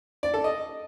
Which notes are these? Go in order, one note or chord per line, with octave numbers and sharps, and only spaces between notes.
D5
A4
D#5